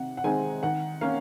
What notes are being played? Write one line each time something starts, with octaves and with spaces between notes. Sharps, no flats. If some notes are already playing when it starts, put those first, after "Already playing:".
Already playing: C3 D#3 F#5
F#5
D#3 G#3 C4 D#4 G#5
D#3 F#5
A#3 C#4 F5